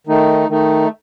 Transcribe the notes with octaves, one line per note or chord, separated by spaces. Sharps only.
D#3 A3 D#4
D#3 A3 D#4